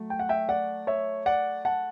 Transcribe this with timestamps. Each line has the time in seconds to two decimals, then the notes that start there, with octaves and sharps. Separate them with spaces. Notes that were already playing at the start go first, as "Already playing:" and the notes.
Already playing: F#3 A3
0.10 G5
0.19 F#5
0.29 E5 G5
0.49 D5 F#5
0.87 C#5 E5
1.26 D5 F#5
1.65 F#5 A5